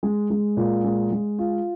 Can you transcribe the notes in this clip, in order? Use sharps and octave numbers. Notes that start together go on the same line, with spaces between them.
G#3
G#3
A#2
G#3
G#3
F4